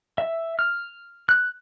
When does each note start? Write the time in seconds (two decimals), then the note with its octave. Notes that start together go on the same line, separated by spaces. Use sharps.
0.18 E5
0.59 F6
1.29 F#6